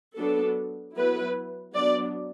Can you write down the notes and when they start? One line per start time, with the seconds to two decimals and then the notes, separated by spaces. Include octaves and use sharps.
0.17 F#3 B3 D4 A4
0.96 F#3 B3 E4 B4
1.75 F#3 B3 D4 D5